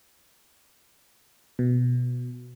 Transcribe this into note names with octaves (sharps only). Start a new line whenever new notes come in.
B2